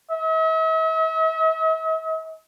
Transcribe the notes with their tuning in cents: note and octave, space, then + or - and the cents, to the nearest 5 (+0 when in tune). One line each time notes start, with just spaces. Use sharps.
E5 -45